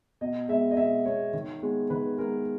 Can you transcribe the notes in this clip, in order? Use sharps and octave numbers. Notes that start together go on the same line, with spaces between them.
B2 D#5
G#3 B3 E5
D#5
B2 E5
G#3 B3 C#5
D#3
G#3 B3
D#3 B4
G#3 B3 A#4